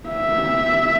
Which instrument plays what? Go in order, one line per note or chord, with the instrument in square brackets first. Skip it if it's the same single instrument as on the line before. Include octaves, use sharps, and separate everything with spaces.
[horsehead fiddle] E5